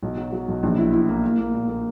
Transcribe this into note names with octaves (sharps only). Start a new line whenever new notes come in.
B1
F#3
F#3
B1
A#1
E4
E4
A#3
A#3
A#3
A#2
A#3